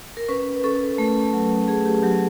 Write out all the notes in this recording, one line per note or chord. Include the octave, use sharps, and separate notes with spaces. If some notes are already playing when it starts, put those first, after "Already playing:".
A#4
C#4 B4
C#4 A4
A3
F#3
A3 G#4
G4
F#3 G4